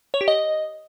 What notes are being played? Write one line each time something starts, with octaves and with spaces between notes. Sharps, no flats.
C#5
G4
D#5